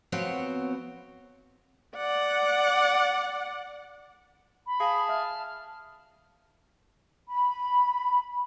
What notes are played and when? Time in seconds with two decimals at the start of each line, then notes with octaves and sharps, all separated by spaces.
0.12 F3 B3 C4 F#4 C5 C#5
1.97 D5 F#5
4.66 B5
4.80 G#4 F5 A5
5.09 E5 F6
7.29 B5